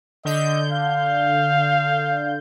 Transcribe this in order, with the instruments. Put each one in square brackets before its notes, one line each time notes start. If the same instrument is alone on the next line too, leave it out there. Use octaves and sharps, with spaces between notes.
[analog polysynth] D3 G6 [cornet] D#5
[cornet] F5